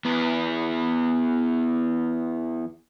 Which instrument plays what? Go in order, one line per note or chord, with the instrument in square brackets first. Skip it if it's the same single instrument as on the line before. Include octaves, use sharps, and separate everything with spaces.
[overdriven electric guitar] E2 B3